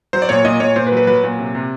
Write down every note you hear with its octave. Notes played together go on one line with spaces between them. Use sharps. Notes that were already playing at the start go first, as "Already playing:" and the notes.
F#3 C5
D5
A#2 C#5
A#2 D#5
A#2 C#5
A#2 C5
B4
F#3
B4
F#3 B4
A#2
C3
C3